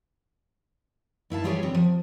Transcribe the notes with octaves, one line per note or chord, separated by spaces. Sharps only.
G2 E4 F5 A5
E3 G3 F4 G4 G#4 C#5
D3 G3 C4 C#5
F3